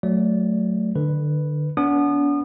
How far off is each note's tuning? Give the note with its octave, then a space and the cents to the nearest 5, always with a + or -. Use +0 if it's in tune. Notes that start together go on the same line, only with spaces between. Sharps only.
F#3 +0 A3 +0 D5 -20
D3 +25 B4 +0
B3 -5 D4 -40 D#6 -35